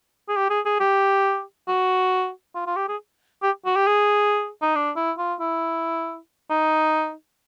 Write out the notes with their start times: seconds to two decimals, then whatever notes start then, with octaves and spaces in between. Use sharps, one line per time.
0.28 G#4
0.36 G4
0.50 G#4
0.65 G#4
0.80 G4
1.68 F#4
2.55 F4
2.67 F4
2.77 G4
2.88 G#4
3.43 G4
3.66 F#4
3.76 G4
3.87 G#4
4.62 D#4
4.75 D4
4.96 E4
5.18 F4
5.40 E4
6.50 D#4